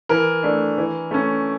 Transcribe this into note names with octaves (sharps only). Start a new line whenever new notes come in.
E3 A#4
A3 D4
E3
A3 C#4